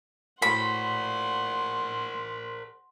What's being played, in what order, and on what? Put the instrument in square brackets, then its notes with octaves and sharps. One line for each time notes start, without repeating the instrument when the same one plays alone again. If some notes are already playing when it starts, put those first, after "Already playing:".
[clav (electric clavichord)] A2 F#4 [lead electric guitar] A#4 C5 [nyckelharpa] F#5 C6 [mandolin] B5